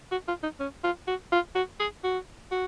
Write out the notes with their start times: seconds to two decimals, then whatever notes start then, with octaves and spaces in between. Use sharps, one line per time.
0.11 F#4
0.28 F4
0.43 D#4
0.60 C#4
0.83 F4
1.07 F#4
1.32 F4
1.55 F#4
1.79 G#4
2.04 F#4
2.51 F#4